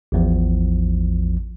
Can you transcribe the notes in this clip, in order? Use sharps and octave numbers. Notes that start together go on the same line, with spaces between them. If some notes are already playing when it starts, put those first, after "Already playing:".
A1 E2 F3